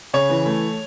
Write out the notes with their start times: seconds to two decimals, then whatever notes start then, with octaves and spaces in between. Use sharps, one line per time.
0.14 C#3 C#5
0.29 E3
0.46 A3